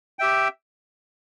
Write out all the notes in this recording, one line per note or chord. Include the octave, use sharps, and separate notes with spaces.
G4 E5 G5